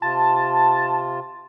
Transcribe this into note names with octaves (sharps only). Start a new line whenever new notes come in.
C3 F4 A5